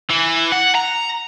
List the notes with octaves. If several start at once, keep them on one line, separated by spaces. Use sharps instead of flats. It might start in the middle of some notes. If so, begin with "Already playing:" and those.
E3
F#5
A#5